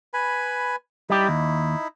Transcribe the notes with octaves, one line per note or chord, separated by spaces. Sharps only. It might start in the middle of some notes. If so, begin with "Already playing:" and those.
B4 G#5 B5
G3 D#4 E4 G4
D#2